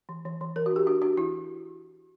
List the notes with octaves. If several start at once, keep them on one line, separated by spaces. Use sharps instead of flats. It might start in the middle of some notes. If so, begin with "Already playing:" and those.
E3
E3
E3
E3 A#4
F#4
D4
G4
D4 F#4
D4 F#4
E3 E4